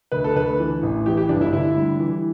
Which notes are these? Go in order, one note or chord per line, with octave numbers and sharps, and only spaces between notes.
D2 B4
A4
D2 B4
E3
A1
E3 G4
G4
G1 D4
E4
D3 E4
G3
E3